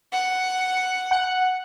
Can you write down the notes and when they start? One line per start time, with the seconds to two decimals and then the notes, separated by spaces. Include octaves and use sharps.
0.12 F#5
1.11 F#5